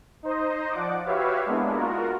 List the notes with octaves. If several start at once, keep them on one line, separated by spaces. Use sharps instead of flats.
D#4 C5 D#5
F3 D5 F#5 D6
F#4 G4 B4 C#5 E5 F5
G#3 A#3 B3 D4 E4
F4 F#4 A#4